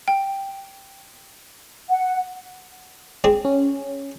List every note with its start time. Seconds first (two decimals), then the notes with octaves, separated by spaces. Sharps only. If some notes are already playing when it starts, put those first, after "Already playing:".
0.08 G5
1.89 F#5
3.24 C4 D4 G#4
3.45 C#4